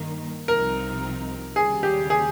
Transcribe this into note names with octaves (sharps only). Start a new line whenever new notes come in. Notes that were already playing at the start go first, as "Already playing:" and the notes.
Already playing: G2 D#3 A#3 D#4
C2 C3 F3 C4 D#4 A#4
D#2 C#3 G3 G#4
G4
G#4